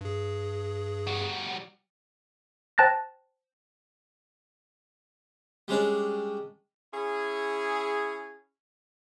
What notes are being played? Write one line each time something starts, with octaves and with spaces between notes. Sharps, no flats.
G2 G#4
G3 F#4
C5 G5 A5 F#6 A6 A#6
G3 G#3 C#4 D4
C#4 E4 G#4